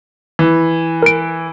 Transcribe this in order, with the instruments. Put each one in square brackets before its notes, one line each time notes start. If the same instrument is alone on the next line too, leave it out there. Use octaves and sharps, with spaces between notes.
[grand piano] E3
[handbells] A#4 D7